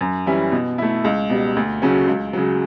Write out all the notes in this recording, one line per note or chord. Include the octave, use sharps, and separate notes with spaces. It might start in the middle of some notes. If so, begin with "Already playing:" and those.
F#2
E3 G3 C#4 E4
B2
A3 E4
C#2
B2 G3
D2
C#3 F#3 A3 C#4
C#2
C#3 F#3